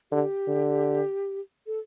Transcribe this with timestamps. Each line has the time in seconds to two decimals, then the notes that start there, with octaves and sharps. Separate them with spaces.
0.12 D3 G4
0.47 D3
1.67 A4